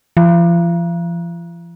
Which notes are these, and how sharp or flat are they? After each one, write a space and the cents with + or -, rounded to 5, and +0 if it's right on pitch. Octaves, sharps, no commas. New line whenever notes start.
F3 -40